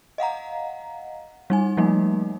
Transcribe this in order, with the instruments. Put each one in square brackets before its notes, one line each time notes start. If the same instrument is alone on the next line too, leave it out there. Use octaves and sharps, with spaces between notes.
[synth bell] D#5 F5 F#5 A#5
G3 D#4 G#5
F3 G3 A3 A#3 D#4